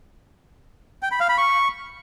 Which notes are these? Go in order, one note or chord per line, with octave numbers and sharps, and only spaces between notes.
G5
B5
F5
B5
C#6